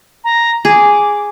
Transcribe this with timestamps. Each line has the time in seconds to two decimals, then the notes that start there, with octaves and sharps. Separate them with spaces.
0.24 A#5
0.65 G#4 D6